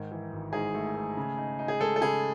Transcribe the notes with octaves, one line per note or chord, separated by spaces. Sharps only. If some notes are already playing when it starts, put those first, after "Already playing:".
Already playing: G#2 D#3
E3
G#1
G#2 G#4
A3
A3
C#3
D#4
D#4
G#4
G#3 A4
A4
C#3 G#4